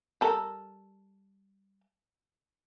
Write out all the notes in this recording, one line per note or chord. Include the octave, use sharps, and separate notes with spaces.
G3 A4 A#4